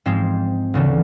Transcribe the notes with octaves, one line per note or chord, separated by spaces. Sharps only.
G#2 F3 G#3 C4
D2 C#3 E3 A3